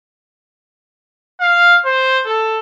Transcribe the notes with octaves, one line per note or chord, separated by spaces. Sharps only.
F5
C5
A4